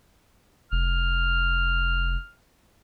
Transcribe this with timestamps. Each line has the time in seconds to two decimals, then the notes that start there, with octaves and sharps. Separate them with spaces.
0.72 F1 F6